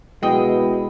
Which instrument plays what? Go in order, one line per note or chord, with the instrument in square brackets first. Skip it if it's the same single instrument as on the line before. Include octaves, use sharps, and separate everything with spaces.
[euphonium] B2 [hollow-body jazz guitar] G#3 [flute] E4 [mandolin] D#5 G5